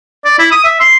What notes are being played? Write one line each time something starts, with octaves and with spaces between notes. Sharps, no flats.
D5
E4
D#6
E5
C6